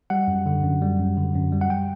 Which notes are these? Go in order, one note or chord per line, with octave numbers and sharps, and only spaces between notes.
G3 F#5
F#2
D3
F#2
G3
F#2
D3
F#2
G3
F#5
G5